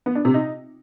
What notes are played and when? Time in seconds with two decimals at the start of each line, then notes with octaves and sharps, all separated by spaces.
0.06 B3
0.15 D4
0.25 C3
0.34 D#4